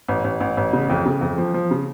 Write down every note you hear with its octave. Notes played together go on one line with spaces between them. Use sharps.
A1
A1
A1
A1
C#3
F2
C#3
F2
F3
F3
C#3